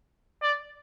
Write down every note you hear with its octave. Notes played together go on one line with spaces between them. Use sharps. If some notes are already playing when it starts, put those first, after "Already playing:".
D5